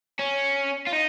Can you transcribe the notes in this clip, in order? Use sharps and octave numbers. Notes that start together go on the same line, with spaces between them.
C#4
F4
D#4